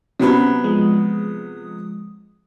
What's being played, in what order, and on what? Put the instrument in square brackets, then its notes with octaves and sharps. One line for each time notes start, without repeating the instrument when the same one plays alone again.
[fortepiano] C3 F#3 B3 [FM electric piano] C#4 C5
[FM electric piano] F3 G#3 D#6